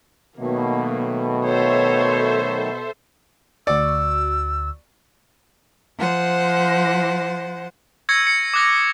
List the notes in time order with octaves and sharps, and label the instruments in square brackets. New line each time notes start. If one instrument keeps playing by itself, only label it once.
[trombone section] B2 [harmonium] D#3 F#3 A3 [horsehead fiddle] A#3
[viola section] A4 C5 E5 [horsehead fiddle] C#5
[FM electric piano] D2 F#4 C#6 [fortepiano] D5 [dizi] E6
[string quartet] F3 C5 F#5
[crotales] C#6 E6 G#6 A#6 C#7
C#7
D6 D#6 F#6 A#6